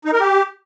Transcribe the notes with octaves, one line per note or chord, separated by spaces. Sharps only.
D#4
A#4
G4